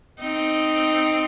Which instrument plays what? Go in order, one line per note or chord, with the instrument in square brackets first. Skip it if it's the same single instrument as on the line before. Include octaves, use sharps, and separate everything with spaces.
[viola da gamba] C4 D#4